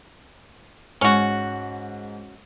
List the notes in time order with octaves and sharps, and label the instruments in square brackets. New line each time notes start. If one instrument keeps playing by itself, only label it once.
[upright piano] G#2 [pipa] C#4 F#4